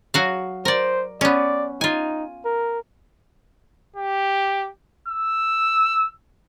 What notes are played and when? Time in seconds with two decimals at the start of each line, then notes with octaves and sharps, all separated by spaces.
0.14 F#3 F#4 F5
0.65 A#4 C5 D5
1.21 B3 C#4 D5
1.81 D#4 F4 G#5
2.45 A#4
3.96 G4
5.08 E6